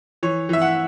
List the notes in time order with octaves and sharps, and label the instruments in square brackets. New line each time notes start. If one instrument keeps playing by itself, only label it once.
[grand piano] E3 C#5
E3 E5
F#5